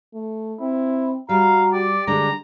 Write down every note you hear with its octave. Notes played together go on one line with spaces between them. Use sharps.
A3
C4 E4
G3 F#4 F5 A#5
G4 D5
D3 G3 G#3 D4 A#5